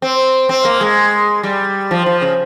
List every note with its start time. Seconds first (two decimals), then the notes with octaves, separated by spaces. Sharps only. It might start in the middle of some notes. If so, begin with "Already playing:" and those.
0.02 C4
0.49 C4
0.65 A#3
0.81 G#3
1.43 G3
1.91 F3
2.06 F3
2.21 C#3